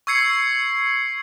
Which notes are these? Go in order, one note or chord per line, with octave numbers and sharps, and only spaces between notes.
C#6 E6 G#6 C7 C#7